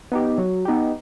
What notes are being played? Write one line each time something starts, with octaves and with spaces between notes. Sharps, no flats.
B3 D#4 G4
F#3
B3 D#4 G4